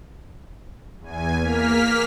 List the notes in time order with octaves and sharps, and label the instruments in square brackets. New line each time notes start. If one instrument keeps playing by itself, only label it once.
[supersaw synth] E2 G#5
A#3 F6 B6